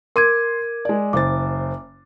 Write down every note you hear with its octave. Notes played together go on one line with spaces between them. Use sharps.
A#4 C6 D6 G#6 D#7
G#3 D5
F#1 C5 D6 A6